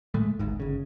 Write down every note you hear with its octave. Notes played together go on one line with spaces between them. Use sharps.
D1 A2 G#3 A3
D1 G#1 G#2
G1 C#3